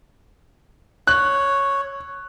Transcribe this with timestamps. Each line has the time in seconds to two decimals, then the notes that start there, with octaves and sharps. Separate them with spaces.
1.07 C#5 F#6